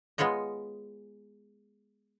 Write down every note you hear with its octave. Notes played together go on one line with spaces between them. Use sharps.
G#3 B3 F4 C#5 D#5